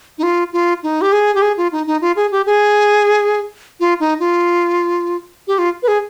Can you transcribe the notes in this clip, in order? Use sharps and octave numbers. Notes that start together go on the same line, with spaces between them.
D#4
F4
F4
D#4
G4
G#4
G4
G#4
F4
D#4
D#4
F4
G#4
G4
G#4
F4
D#4
F4
G4
F4
B4
G#4